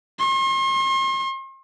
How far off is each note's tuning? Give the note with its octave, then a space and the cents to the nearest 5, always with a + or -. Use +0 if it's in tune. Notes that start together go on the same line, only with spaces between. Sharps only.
C6 +40